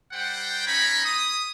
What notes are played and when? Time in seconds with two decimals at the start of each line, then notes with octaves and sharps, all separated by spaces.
0.12 G3 C5 F#5 G5
0.66 C#4 D#4 C#5 G#5 A#5 B5
1.05 D#6